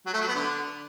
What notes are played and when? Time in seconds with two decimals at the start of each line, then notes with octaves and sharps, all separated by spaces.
0.06 F#3
0.13 A3
0.21 F#3
0.28 B3
0.35 D3